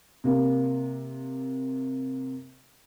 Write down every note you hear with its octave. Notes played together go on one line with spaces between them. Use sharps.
C3 A#3